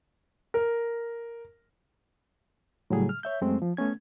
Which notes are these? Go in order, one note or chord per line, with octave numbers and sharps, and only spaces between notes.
A#4
A2 C#3 F#3 G3 G#4
F6
C#5 E5 G6
F#2 G#3 A3 C4
F3
A3 B3 C#4 G#6